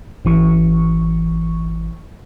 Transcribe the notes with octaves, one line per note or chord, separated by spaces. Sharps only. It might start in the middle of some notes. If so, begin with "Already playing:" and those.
G#1 E3 C#6